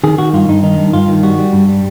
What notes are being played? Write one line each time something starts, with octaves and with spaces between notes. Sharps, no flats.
D#3 G#4
D#3 F#4
G2 F4
G2 D#4
D#3 D#4
G2
G2 F4
D#3
G3 F#4
G3
G2
G3